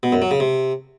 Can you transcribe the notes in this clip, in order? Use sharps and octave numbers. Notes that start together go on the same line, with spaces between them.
B2
F#2
F#3
C#3
C3